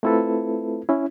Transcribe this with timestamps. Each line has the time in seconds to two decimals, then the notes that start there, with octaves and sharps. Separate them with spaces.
0.03 A3 C4 E4 F4 A4 B4
0.89 C#4 E4